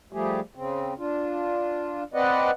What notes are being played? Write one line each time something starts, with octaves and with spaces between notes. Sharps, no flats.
F3 G3 A3 G4 G#4
C#3 C4
D4 F4
C4 B4 D5 D#5 F#5